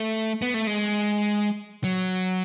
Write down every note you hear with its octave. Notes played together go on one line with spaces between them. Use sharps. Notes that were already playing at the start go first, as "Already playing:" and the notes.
Already playing: A3
B3
A3
G#3
F#3